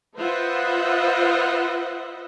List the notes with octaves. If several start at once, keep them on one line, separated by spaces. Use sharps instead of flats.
F4 B4 C5 D#5 E5 F#5